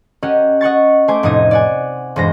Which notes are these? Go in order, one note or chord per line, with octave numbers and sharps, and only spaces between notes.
C#4 G4 A#4 D#5 F#5
D#5 F#5 C#6 A6
A3 C5 G#5 D6
F1 A2 D#4 D#5 D#6 G#6
D5 F#5 G#5
E1 G2 G#3 C5 A#6